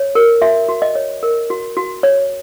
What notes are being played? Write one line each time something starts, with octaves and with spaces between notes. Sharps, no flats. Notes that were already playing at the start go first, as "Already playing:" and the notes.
Already playing: C#5
A#4
F#4 E5
F#4
D#5
C#5
A#4
F#4
F#4
C#5